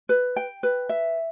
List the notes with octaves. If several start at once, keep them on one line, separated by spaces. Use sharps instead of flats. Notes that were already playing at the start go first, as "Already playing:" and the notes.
B4
G5
B4
E5